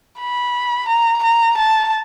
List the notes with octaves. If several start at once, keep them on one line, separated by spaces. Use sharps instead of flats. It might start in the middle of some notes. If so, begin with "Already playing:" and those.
B5
A#5
A#5
A5